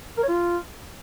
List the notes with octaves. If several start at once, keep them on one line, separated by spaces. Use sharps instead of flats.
A#4
C#5
F4